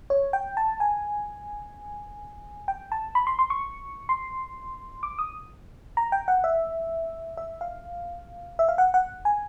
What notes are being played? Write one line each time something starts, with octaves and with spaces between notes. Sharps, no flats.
C#5
G5
A5
G#5
G5
A5
B5
C6
C6
C#6
C6
D6
D#6
A#5
G5
F#5
E5
E5
F5
E5
F5
F#5
F#5
G#5